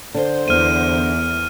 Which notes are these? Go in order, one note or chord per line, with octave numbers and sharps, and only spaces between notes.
D3 C5
E2 F6 D#7